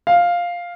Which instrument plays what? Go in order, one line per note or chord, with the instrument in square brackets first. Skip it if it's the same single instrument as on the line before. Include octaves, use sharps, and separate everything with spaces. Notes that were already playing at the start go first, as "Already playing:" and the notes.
[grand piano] F5